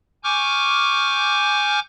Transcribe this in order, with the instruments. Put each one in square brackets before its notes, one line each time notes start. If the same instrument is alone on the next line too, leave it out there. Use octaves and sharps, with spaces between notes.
[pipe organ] G#5 C#6 D6 F6 G6